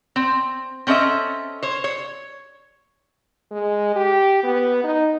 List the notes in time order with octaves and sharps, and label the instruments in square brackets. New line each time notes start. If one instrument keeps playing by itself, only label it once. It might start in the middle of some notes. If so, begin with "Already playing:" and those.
[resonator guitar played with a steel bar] C4
C4 C#4 A4 D#5 E5
C5 C#5
C#5
[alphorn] G#3
G4
B3
D#4